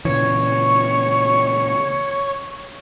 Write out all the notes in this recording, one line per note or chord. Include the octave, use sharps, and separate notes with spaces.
A#2 C#3 E3 C#5